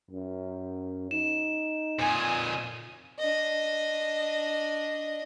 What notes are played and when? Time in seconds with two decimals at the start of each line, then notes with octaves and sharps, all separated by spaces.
0.11 F#2
1.11 D#4 E7
1.99 F2 A#2 G#5 D#6
3.19 D4 D#5